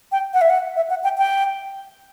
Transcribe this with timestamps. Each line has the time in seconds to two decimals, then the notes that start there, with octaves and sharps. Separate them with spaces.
0.12 G5
0.34 F#5
0.41 E5
0.50 F#5
0.76 E5
0.90 F#5
1.04 G5
1.18 G5